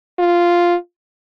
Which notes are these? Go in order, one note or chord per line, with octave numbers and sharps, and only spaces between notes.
F4